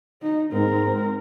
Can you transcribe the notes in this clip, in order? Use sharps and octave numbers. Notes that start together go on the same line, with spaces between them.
D#4
G#2 C4 A#4